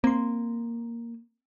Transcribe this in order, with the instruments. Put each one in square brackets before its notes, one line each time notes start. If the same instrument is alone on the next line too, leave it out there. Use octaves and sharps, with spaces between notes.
[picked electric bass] A#3 [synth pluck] C4 C6